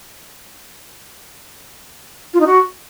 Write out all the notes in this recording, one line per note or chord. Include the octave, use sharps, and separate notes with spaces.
F4
D#4
F#4